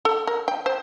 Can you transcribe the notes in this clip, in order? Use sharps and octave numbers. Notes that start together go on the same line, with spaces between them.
A4
A#4
G5
C5